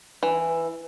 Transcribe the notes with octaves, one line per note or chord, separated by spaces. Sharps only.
E3